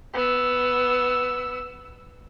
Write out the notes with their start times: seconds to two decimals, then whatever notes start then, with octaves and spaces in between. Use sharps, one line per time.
0.14 B3 E6